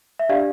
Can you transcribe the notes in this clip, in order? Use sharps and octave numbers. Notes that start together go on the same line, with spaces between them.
E5
D4 G4 D5 F5